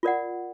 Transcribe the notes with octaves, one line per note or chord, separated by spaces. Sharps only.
F4 A#4 D5 F#5